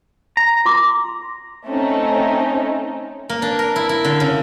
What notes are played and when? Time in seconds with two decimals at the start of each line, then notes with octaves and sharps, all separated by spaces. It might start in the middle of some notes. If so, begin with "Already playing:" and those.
0.37 A#5
0.65 F4 C6 D6
1.66 A3 C4 C#4 D#4
3.29 A#3
3.42 D4
3.59 A#4
3.76 E4
3.89 E4
4.05 D3
4.20 C#3